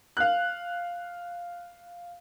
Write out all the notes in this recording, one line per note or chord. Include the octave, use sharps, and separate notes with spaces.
F5 F#6